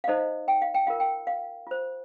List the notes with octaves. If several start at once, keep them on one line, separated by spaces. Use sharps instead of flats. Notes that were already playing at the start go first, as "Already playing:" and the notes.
F5
D#4 A4 C5 D#5
G5
F5
G5
F4 A#4 F5
G5
F5
F4 C5